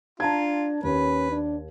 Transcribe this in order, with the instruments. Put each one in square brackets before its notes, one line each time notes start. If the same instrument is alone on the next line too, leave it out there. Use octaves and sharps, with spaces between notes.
[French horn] D4 [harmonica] F4 [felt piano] A5 A#5 G#6
[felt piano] D#2 [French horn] C#4 [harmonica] B4
[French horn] D4